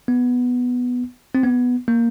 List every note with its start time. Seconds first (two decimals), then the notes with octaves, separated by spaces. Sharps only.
0.08 B3
1.35 C4
1.44 B3
1.88 A#3